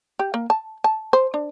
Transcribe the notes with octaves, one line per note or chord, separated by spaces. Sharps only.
G4
A#3
A5
A5
C5
D4